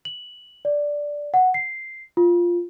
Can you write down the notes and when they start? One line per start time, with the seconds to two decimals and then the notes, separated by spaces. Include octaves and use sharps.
0.05 F#7
0.65 D5
1.34 F#5
1.54 C7
2.17 F4